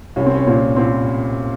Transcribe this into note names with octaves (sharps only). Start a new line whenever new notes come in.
C2 C#4
C4
C#4
A#2 C4
A#2 C4